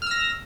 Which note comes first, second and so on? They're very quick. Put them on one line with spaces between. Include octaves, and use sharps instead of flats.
F6 E6 A#6